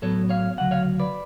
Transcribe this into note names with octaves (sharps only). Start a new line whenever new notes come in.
A2 F#3 B3 A4 C#5
C#5 F5
D2 C#3 F#3 F#5
C#5 F5
B4 D5